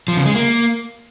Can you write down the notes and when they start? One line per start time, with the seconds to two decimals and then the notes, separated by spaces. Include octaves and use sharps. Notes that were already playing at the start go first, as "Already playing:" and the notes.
0.08 F3
0.17 C#3
0.26 G#3
0.35 A#3